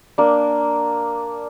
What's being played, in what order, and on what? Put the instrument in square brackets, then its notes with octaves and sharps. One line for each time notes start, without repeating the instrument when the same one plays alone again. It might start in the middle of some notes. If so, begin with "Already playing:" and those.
[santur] A#3 D4